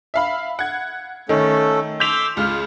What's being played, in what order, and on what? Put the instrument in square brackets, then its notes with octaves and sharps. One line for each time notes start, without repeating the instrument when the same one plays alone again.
[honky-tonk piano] E5 F5 B5
F#5 G#6
[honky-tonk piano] D#3 [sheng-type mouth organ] A3 C#4 A4
[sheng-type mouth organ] C6 D6 E6 [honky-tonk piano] G6 B6 F7
[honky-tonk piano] C#2 F6 [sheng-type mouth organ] F4